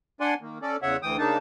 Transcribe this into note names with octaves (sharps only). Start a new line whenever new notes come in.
D4 D5 F#5 G#5 C6
D#3 A#3
C#4 A4 D5
E2 C#3 C#5 E5 F#5
D2 E3 G5 D#6
C#3 A#3 D4 D#4 A5